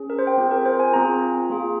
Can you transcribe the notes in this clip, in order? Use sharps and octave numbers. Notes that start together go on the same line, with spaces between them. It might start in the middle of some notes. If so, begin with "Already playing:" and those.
Already playing: C#4 G#4
A#4
C5
G5
C4 F4 G#4
A#4
C5
G#5
C4 F4 G#4 A#5
A#3 F4 G#4